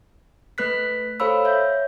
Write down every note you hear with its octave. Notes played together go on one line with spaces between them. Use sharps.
A3 B4 F#6 B6
A4 C5 C#5 F5 B5 E6
C#5 E5 G6